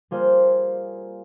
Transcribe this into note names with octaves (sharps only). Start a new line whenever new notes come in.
G3 A#3 F4 G#4 C5